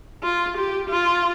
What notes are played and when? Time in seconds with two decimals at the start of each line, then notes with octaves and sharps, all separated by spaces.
0.23 F4
0.57 G4
0.90 F4